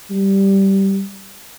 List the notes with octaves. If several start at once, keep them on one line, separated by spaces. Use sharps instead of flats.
G3